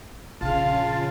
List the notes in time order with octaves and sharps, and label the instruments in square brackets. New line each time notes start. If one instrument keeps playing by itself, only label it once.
[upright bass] A#1 [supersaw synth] C#3 F4 [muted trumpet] F5 [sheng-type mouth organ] A5